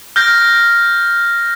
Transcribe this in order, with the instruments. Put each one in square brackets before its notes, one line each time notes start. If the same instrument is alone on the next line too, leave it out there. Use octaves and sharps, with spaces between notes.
[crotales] F6 G6 A#6